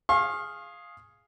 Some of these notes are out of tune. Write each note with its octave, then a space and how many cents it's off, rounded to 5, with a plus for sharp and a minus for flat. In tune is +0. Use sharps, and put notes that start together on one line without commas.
G#4 +0 F5 +0 C#6 -45